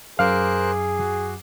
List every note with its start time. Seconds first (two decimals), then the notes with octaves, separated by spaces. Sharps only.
0.19 F#2 G#4 A#4 C5 F5 D6 F#6 C7
0.98 F#4